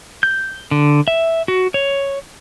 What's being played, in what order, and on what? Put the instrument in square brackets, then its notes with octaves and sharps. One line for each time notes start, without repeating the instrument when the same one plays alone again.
[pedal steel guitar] G6
D3
E5
F#4
C#5